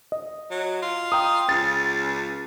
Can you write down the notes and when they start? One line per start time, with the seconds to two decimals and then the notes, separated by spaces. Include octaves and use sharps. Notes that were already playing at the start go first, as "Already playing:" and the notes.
0.12 D#5
0.51 F#3
0.82 F4
1.12 G5 A#5 D#6
1.49 C#2 A6